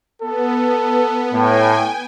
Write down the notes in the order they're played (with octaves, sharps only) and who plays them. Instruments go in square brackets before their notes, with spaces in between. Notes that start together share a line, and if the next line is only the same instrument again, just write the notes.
[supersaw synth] B3 [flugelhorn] A4
[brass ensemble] A2 [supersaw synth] G5 G#5